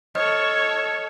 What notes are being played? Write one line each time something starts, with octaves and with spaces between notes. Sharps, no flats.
A4 C#5 D#5 F6